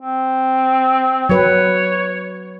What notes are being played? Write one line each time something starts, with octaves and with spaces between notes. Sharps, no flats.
C4
F#3 B4 C#5